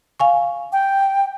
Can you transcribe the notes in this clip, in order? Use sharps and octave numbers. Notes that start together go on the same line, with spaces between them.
F5 G#5 C#6
G5